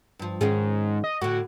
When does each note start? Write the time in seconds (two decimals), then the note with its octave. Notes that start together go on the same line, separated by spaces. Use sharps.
0.19 G2 F3
0.41 G#2 D#3 C#4 G#4
1.04 D#5
1.21 A2 D3 F#4